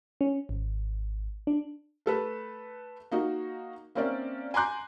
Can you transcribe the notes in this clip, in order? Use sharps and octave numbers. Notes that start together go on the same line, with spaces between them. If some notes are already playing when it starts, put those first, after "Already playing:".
C#4
G#1
D4
A3 A4 B4
A#3 D#4 F#4
A#3 C4 C#4 A#4 D5 E5
G#5 A#5 C6 D6 F#6 G6